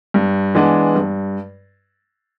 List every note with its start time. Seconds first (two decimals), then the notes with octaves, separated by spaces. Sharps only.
0.14 G2
0.55 E3 G#3 B3 D4
0.95 G2